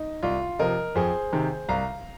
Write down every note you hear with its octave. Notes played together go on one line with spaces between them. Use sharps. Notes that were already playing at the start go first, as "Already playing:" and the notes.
Already playing: D#4
C2 F4
C3 F3 A#4 D#5
F2 G#4 C5
C3 D#3
C2 F5 A#5